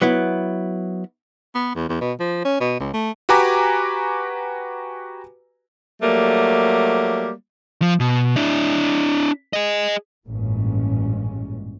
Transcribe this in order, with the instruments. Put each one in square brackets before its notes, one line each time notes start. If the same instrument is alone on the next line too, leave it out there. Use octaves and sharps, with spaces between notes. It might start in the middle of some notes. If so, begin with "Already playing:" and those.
[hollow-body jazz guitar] F#3 B3 E4
[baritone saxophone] B3
E2
E2
B2
F3
C#4
B2
C#2
A3
[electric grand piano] F#4 G4 B4 G#5 A#5 D6
[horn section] F#3 G3 A3 A#3
[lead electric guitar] F3
B2
D4 E4
G#4 D#5
[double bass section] A1 G2 A#2 G#3 C#4